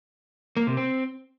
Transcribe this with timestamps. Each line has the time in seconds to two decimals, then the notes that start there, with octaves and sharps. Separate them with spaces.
0.57 A#3
0.67 C3
0.77 C4